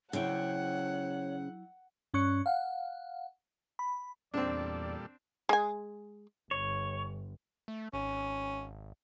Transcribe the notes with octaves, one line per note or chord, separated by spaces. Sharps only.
C#3 F#3 E4 C5 C#5 E5 F#5 G5
G2 C#4 C#6 F#6 C#7
F5 F#5
B5
E2 A#2 G3 C4 D4 A4 D5
G#3 G#5
G1 C#5
A3
G#1 C#4